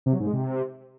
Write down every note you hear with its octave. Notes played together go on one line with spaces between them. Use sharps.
C3
F#3
G#2
G#3
C3